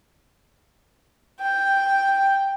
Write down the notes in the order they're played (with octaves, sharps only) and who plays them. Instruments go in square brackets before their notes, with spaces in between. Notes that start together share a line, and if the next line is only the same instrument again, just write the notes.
[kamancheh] G5